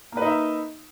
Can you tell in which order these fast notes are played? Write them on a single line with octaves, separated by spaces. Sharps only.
A#3 B4 D#4 E5